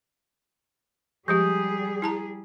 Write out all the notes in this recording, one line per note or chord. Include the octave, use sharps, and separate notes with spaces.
F3 G3 G#3 G4 G#4 D#6 G6
E4 A5 A#5